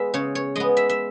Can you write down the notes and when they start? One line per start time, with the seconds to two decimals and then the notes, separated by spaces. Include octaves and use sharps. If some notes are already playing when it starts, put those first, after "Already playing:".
Already playing: G#3 B3 E5
0.14 C#3 C#5
0.35 C#5
0.56 G#3 B3 D#5
0.77 E5
0.89 E5